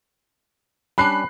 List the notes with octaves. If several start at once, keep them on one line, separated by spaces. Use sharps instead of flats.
G3 C#4 D4 B5 F#6 C7